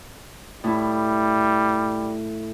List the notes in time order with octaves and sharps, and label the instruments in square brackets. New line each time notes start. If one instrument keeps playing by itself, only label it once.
[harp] A2 E4 [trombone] G3